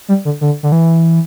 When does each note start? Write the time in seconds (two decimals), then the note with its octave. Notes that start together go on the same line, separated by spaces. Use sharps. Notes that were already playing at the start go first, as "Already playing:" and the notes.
0.08 G3
0.25 D3
0.41 D3
0.63 D3
0.72 E3